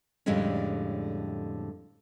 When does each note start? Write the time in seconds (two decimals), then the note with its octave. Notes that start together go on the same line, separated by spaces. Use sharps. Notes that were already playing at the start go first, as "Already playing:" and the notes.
0.26 F2 A2 D3 G3 G#3 C#4